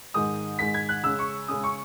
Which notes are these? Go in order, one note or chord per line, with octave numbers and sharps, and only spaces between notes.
G#2 D#3 G#3 D#6
G#2 D#3 G#3 B6
G#6
F#6
C#3 G#3 C#4 E6
C#6
C#3 G#3 C#4 D#6
C#6